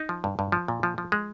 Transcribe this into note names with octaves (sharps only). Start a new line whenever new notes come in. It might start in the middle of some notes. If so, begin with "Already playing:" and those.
Already playing: D#4
F3
G2
G2
F3
A#2
F3
F3
G#3